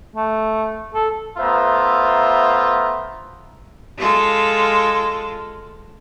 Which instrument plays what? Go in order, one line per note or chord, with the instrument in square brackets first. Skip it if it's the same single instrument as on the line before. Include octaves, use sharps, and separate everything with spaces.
[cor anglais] A3
A4
[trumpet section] A3 B3 F4 C5 E5 A#5
[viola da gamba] G#3 F4 A4